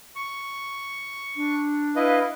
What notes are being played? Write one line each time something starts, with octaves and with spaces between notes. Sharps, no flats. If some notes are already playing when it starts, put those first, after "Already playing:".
C#6
D4
E4 B4 D#5 F5